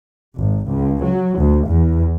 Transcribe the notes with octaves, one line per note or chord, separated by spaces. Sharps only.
G#1
C#2
F#3
D2
E2